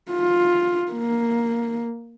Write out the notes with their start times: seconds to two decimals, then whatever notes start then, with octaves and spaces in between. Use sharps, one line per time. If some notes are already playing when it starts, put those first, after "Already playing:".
0.11 F4
0.92 A#3